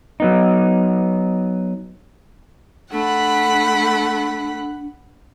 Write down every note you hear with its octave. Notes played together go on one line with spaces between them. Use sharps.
F#3 B3 D#4
A3 D4 F#5 B5